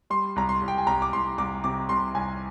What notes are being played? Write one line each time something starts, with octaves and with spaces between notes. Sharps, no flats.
G3 C6
C2 A#5
C6
C2
G5
G#5
C2 A#5
D6
C2 C6
C2 D6
C3 D6
C2 C6
C2 G#5